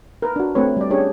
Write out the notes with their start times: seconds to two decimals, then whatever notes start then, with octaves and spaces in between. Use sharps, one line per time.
0.22 A#4 B4
0.36 D4 F#4
0.55 A3 C4 B4 C#5
0.77 G3 D5
0.90 C#4 D4 G4 G#4 C#5